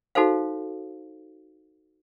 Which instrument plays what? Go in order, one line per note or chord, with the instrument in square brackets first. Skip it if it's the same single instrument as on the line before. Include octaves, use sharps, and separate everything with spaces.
[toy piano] D#4 F#4 A4 C5 F5